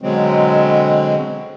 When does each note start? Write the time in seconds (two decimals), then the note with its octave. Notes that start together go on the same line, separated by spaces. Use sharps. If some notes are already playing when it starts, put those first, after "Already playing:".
0.02 B2 D3 F#3 G#3 C4